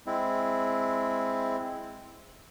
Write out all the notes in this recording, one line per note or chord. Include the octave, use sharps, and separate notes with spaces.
G#3 C4 E4